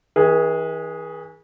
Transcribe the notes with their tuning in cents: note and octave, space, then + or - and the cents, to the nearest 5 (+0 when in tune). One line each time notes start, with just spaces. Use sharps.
E3 -40 G#4 +0